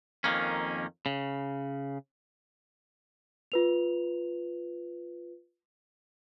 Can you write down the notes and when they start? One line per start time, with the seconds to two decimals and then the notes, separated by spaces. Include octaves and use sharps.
0.24 F2 D#3 A#3 C#4
1.06 C#3
3.52 F4 B4 F7